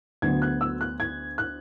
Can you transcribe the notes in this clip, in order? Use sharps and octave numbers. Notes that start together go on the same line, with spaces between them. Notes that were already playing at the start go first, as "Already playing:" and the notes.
D2 D3 F#3 B3 G#6
F#6
E6
F#6
G#6
F#6